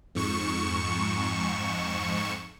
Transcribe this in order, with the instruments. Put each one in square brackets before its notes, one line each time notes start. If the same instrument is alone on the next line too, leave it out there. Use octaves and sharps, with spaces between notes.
[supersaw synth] F2 G#2 C#6 C#7 E7